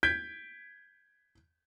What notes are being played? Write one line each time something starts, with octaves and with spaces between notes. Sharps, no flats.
G6 G#6 B6 D7